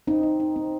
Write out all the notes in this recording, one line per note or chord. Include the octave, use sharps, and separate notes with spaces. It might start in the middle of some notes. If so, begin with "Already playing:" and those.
C4 D#4
D#4
D#4
C4